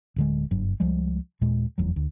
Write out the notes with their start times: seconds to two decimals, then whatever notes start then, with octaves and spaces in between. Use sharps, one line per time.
0.16 D1 D3 G#3
0.51 F#1 G2 F#3
0.80 C#2 F3 G3 G#3
1.41 D#2 A#2 G#3
1.78 F1 E2 F#3
1.96 D2